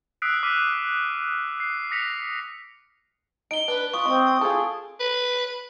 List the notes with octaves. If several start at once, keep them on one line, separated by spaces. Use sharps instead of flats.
D#6 E6 F#6 B6 C7 D7
D6 F6 B6 D#7
C7
D#6 A#6 B6 C#7 F7
D#4 D7 G7
D4 B4
F4 B4 C#6 D#6
G#3 C4
F4 G#4 A4
B4